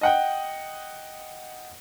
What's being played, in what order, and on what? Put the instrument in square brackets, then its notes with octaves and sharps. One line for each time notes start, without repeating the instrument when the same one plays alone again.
[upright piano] D#5 F#5 G5